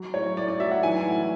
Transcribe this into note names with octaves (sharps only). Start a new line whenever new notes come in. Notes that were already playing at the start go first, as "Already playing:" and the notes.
Already playing: F#3
A2 C#5
A2 D5
D5
F#3 E5
F#5
E3 G#5
A2